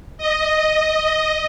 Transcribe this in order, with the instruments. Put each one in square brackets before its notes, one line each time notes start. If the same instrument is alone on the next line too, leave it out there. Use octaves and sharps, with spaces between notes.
[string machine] D#5